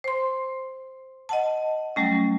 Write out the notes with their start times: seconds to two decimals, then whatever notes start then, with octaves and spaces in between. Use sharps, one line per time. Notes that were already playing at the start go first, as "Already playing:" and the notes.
0.04 C5 C6
1.29 D#5 F#5 A5
1.96 F#3 G3 A3 C#4